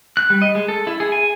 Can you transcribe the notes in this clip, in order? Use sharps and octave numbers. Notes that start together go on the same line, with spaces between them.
F#6
G3
D#5
G#3
A4
E4
G#4
G#5